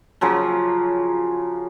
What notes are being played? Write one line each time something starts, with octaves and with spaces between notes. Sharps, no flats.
C#3 F3 F#3